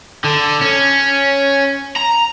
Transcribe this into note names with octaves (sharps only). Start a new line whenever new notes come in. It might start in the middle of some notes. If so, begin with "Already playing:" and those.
D3
C#4
A#5